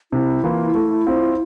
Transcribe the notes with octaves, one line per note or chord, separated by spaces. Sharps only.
C3 E4
E3 A#3 F4
A3
C4 F4 C5